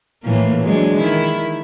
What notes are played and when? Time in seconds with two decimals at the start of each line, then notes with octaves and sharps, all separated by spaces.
0.23 A2 E3 A#3
0.62 F#3 G#3 D4
0.98 D#3 E4